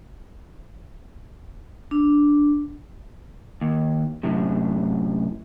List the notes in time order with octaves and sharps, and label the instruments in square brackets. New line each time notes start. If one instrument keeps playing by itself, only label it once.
[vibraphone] D4
[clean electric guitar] D#2
F#2 A2 C3